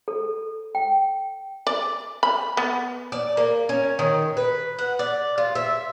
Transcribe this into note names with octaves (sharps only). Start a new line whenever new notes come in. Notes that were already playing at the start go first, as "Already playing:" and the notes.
A4
G5
D5
B5
B3
D5
A#3
C#4
D#3
B4
F#5
D5
F4
E5